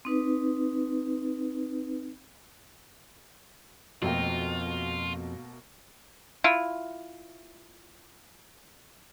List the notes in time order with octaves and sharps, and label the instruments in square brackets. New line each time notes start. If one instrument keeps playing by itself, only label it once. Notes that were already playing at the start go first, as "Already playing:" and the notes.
[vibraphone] C4 D#4 B4
[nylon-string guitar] F2 D#5 G5 [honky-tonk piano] B2 A3 A#3 [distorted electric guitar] F4
[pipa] E4 F4